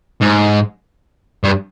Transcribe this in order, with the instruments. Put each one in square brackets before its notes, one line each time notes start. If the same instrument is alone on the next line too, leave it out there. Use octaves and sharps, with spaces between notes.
[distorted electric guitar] G#2
G2